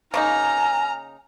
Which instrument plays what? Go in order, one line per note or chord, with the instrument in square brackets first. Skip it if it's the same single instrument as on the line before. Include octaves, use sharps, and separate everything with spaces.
[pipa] C#3 A#3 D#4 [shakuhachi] G#5 [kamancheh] A#5 F6